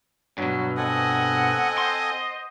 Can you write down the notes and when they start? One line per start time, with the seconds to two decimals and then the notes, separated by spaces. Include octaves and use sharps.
0.38 G2 B2 F#3
0.77 C4 A4 D#5 F#5 G#5
1.78 C5 C6